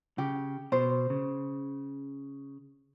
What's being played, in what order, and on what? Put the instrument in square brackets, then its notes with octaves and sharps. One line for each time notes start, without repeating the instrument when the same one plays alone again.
[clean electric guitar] C#3 [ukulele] G4
[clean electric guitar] B2 [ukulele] C5
[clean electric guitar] C#3